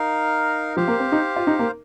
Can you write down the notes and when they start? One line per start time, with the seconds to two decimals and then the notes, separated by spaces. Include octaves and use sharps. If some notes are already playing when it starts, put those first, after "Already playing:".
Already playing: D#4 A#4 F5
0.76 F3 G4 C5 F5
0.88 A#3
1.00 C4
1.12 D#4
1.36 F4
1.47 D#4
1.59 A#3